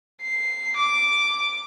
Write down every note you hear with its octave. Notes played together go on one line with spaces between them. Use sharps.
C7
D6